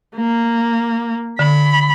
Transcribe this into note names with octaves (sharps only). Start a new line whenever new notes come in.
A#3
D3 B5